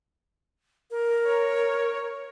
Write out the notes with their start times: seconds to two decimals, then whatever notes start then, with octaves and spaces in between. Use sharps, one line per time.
0.91 A#4
1.25 C#5